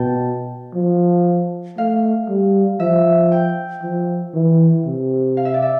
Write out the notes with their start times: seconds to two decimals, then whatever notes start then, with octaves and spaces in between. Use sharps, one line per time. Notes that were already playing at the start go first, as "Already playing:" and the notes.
Already playing: B2 G5 A5
0.75 F3
1.78 A3 F5
2.28 G3
2.80 F3 E5
3.32 G5
3.83 F3
4.34 E3
4.86 C3
5.37 F5
5.45 E5
5.54 D5
5.62 E5